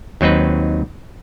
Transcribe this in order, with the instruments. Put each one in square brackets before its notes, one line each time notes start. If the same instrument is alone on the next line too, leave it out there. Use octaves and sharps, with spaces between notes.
[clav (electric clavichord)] D#2 F#3 C4 D#4 B4